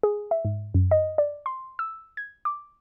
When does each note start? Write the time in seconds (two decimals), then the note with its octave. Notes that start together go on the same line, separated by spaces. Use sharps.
0.03 G#4
0.31 E5
0.45 G#2
0.74 F#2
0.91 D#5
1.18 D5
1.46 C6
1.79 E6
2.17 G#6
2.45 D6